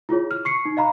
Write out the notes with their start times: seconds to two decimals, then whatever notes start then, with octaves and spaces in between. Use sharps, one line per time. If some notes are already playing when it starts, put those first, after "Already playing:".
0.09 E4 F4 G#4 C#5
0.31 F6
0.45 C#6 C7 C#7
0.65 D#4
0.77 D#5 F5 A#5 B5